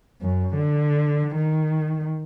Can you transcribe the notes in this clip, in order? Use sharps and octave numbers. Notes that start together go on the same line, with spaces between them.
F#2
D3
D#3